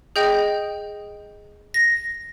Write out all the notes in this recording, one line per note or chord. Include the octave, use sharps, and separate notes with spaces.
G#4 D#5 G5 G6
A#6